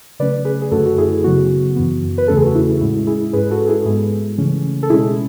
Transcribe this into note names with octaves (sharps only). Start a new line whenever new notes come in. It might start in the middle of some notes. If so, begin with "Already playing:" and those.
C#3 F#3 A3 C#4 B4 D5
G#4 B4
G#4
F#2 D3 A3 C#4 F#4 A4
F#4
E4 G#4
C#3 F#3 B3 F#4
F#2 E3 B3
B4
E2 C#3 E3 A3 C#4 A4
G#4
F#4
E4
A2 G#3 C#4 E4
E4 G#4
G#2 G#3 C#4 G#4 B4
F#4 A4
E4 G#4
G#2 G#3 B3 E4 G#4
C#3 E3 A3 C#4
A4
B2 G#3 C#4 E4 G#4